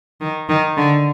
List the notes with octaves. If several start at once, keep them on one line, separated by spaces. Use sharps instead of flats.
D#3
D#3
D3